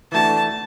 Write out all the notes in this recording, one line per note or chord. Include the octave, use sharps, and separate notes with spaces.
E3 A3 D4 F#4 A5